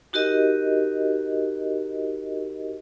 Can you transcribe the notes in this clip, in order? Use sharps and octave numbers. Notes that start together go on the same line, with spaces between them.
D#4 F#4 G4 A#4 D#5